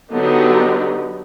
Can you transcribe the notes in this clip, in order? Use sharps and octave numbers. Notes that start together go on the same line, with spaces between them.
D3 F#3 B3 D#4 G4